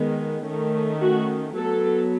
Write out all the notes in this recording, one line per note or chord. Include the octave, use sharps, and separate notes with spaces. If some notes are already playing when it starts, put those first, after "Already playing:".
Already playing: D#3 G#3 B3
D#3 A3 C#4
F#4
F#3 B3 A4